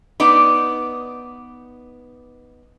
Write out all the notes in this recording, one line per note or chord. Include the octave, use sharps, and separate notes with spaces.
B3 D#4 D5